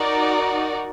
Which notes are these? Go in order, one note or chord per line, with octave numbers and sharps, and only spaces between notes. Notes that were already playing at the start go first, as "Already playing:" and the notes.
Already playing: D#4 F#4 A#4 D5